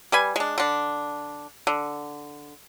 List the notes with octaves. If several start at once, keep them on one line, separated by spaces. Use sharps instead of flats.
G3 B4 G#5
G#3 D4
D3 D4
D3